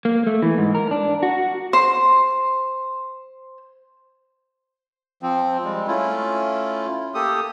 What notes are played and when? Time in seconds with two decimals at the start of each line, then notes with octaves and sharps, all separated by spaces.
0.05 A#3
0.27 A3
0.42 E3
0.58 G#2
0.75 A#4
0.91 D4
1.23 F#4
1.73 C5 C6
5.23 F3 C4
5.64 G3 G#3
5.87 A3 C#4 E4 F4
7.15 A#3 G4 A4 D#6